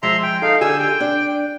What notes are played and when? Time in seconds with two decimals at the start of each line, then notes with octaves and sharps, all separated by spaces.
0.03 F3 G#3 E5 A#5 C6
0.23 G5
0.42 D#4 A4 F5
0.61 D3 G4 G#4 G#5 E6
0.79 G5
1.00 D4